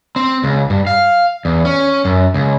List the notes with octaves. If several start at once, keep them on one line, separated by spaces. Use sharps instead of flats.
C4
C#2
G2
F5
E2
C#4
F#2
C#2